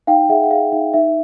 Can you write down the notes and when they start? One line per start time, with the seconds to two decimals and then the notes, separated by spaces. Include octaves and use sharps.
0.07 D#4 F5 G5
0.29 G#4 E5 F#5
0.44 F#5
0.51 G#4 F5
0.72 D#4 E5
0.93 D#4 E5